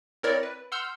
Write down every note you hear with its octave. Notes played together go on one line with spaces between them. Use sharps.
C4 E4 A#4 C#5 D5
B4
F#5 C6 E6 F6 G6